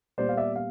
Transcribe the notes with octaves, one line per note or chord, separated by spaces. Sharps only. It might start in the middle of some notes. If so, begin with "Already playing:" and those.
A#2 G3 B3 C5 D5
F5
D5 E5
F5